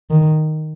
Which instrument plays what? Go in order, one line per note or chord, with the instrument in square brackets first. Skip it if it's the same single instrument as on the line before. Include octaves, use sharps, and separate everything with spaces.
[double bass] D#3